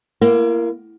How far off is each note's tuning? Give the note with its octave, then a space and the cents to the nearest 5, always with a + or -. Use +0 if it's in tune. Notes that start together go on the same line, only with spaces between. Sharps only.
A#3 +0 E4 +40